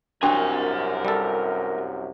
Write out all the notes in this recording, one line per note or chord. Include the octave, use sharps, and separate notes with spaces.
C2 F#2 D4 F#4 A#4 G#5 C6
G3 A4